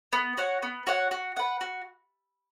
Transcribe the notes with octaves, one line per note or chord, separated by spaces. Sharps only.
B3
F#4 C#5 F#5
B3
F#4 C#5 F#5
F#4
B4 F#5
F#4